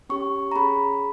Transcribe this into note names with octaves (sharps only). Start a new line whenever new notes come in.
C#4 G4 C#6
A#5
C#4 G#4 B5